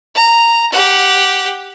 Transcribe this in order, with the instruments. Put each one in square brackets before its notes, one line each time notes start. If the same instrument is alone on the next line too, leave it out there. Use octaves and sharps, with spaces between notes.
[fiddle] A#5
G4 F#5